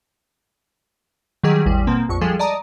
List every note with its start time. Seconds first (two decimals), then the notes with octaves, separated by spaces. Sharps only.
1.44 D#3 F#3 G3 G#4
1.66 A1 E2 G3
1.87 B2 A#3 C4
2.09 A#1 F2 C#6
2.21 F3 G3 G#3 G#4 A4
2.39 D5 D#5 A5 A#5 D#6